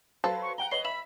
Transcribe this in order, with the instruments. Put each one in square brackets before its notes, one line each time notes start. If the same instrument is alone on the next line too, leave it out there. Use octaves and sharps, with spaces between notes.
[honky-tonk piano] F#3 B4 C5 [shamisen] A4 [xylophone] F5 A5
[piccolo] C#6
[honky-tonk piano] F#5 G5 A#5 [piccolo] G7
[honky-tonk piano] B4 C#5 D#5 [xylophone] C7 F#7 [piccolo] G7
[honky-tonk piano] E5 [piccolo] B5 [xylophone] E7 F#7